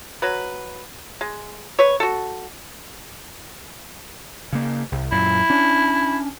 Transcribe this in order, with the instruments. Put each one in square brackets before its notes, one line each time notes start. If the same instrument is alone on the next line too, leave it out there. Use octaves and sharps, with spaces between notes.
[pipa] F#3 B4
G#3
B4 C#5
F#4 A4
[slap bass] C#3 A#3
C2
[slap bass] F#2 A#2 [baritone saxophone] E4
[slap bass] C#4 D4